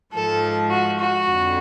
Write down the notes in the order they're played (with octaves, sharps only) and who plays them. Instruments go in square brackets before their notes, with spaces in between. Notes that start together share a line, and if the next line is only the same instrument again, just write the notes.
[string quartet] G#2 F3 A4
F#4
F#4
F2 D3